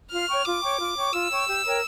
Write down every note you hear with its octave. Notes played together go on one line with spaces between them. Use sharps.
F4 F6
C#5 G5 C#6
F4 D6
C#5 G5 C#6
F4
C#5 G5 C#6
F4 E6
C#5 G5 C#6
G4
A#4 C#5 G5